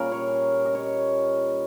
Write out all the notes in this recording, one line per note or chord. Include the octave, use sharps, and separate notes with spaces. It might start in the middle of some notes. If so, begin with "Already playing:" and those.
Already playing: A#2 G3 C#4 G#4 A#4
C#5
D#5
C#5